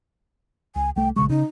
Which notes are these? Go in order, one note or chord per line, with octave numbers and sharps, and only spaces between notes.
C#2 G#5
C2 A3 G5
A#1 C#3 G#3 C#6
C#3 D#4